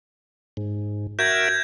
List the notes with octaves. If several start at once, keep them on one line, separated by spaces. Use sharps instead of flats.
G#2
F#4 A#4 E5 G6 G#6